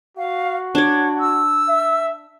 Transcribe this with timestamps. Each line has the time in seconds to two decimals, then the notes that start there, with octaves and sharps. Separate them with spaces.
0.17 F#4 F5
0.75 D4 C#5 D5
1.19 E6
1.68 E5